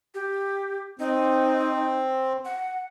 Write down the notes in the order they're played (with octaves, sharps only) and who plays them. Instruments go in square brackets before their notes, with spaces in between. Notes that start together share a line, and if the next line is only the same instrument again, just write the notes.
[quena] G4
[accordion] C4 [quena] D#4
[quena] F#5